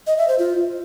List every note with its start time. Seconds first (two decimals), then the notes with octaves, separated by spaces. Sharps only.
0.07 D#5
0.18 E5
0.28 C5
0.39 F4